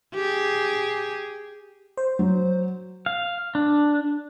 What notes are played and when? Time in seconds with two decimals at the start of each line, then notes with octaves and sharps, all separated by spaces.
0.15 G4 G#4
1.97 C5
2.19 F#3
3.06 F5
3.55 D4